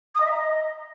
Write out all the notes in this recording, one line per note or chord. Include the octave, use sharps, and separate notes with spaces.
D#6
D#5
E5
A#5
D#5